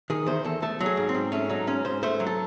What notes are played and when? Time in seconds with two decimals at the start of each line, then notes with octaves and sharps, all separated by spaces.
0.10 D#3 G#4
0.26 E2 C5
0.44 E2 A4
0.62 A3 A4
0.80 F#3
0.86 G#4
0.97 G#2
1.09 C4
1.15 G#2
1.32 A3 C#4
1.49 F#3 D#4
1.67 G#2 C#4
1.85 G#2 C5
2.03 A3 C5
2.20 F#3
2.27 A4